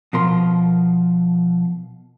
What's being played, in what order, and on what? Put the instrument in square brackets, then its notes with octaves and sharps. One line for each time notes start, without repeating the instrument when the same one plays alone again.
[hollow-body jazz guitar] B2 F3 A#4 C6